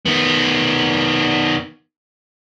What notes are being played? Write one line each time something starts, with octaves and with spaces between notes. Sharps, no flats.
D#3 B3